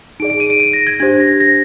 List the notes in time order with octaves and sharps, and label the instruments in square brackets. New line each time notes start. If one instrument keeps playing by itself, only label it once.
[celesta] D#4 D7
G#4 D5
D7
D#7
D7
D7
A#6
G#6
D4 G4 C5 G#6
A#6
A#6